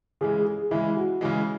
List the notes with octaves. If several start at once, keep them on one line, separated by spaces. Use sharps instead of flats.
C#3 E3 G#3 G#4
G#4
C#3 E3 G#3 E4
F#4
C#3 E3 G#3